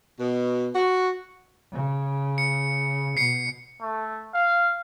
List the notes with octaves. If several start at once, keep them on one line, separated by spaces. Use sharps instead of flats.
B2
F#4
C#3
C#7
B2 C7 C#7
A3
F5